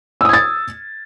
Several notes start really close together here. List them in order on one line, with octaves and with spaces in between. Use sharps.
E6 D#6 G#6 A6